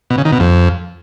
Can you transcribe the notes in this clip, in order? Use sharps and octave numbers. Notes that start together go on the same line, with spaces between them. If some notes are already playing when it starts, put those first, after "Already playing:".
B2
C#3
D#3
B2
F2